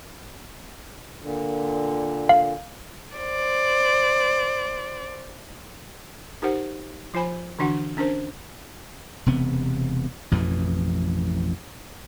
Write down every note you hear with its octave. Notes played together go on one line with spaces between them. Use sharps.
A#2 D3
F5
C5 D5
D#4 G4 A#4 C5 F#5
F3 F4 C5 G#5 B5
D3 E3 D4 F#4 F#5
C#4 D4 A#4 C5
E1 C3 B3
A1 F2 B2 E3